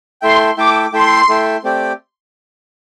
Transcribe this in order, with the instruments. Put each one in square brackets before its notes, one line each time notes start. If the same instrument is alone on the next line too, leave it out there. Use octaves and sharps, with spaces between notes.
[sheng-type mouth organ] A3 E4 A4 E5 G5 [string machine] C6
[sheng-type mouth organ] A3 E4 A4 E5 G5 [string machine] D6
[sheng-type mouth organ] A3 E4 A4 E5 G5 [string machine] C6
[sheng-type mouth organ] A3 E4 A4 E5 G5
A3 C4 G4 D5 G5